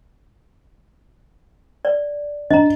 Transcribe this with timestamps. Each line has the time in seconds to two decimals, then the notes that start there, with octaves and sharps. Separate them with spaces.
1.85 D5
2.51 D4 D#5 A#5